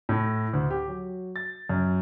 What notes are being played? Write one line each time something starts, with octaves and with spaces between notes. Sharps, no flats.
A2
D2
G4
F#3
A6
F#2